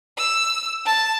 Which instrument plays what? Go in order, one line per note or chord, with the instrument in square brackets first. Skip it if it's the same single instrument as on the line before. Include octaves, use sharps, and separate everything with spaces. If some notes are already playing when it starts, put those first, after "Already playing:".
[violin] E6
A5